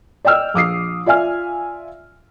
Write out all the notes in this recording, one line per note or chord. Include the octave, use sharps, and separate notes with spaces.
D5 D#5 G5 E6 F6
A#1 D6 D#6 C7
F4 D5 E5 G#5 F6